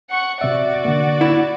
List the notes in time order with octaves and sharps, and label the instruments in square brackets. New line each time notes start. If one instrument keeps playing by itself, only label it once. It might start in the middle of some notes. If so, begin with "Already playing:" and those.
[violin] F#5 C#6
[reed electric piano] C3 E5 [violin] F#4 D5
[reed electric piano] D3 A#3
[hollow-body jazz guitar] E4